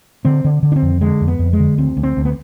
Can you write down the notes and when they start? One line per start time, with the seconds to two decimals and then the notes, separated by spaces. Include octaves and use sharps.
0.25 D3 C4
0.45 D3
0.63 D3
0.72 D4
0.76 C4
0.82 F2
1.01 D3 G#3
1.21 F2
1.28 B3
1.39 F2
1.53 G#3
1.59 D3
1.78 D2 C4
1.97 D2
2.03 C4
2.17 D2
2.25 B3